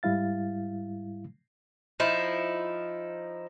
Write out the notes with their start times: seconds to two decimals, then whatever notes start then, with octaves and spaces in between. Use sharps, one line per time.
0.03 G#2 G3 E4 F5 A6
2.00 F3 D#4 E4